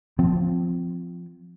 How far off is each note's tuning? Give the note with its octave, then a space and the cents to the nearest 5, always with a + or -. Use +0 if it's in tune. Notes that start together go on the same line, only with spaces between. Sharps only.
F3 +0 C4 -15